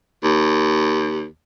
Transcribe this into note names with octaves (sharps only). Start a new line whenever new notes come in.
D#2